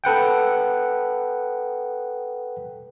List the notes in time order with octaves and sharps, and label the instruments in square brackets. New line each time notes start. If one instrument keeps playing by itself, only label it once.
[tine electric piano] A4 B4 F#5 G5